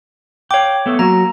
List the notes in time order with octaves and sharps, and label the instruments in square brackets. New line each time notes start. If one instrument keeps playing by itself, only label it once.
[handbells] C#5 D6 [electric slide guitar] F5 G5
[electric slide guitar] A3 B3 A4
[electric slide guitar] F#3 F#4 [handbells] A#3 A#5